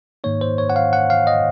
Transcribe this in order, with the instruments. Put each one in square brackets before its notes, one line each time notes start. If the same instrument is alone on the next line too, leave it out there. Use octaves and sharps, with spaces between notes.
[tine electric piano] G#2 D#3 A#3 D#4 C#5
C5
C#5
F#5
F5
F#5
F5
D#5